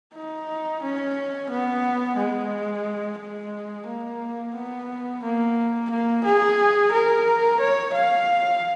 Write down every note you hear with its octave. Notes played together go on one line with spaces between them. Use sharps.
D#4
C#4
B3
G#3
G#3
A#3
B3
A#3
A#3
G#4
A#4
C#5
F5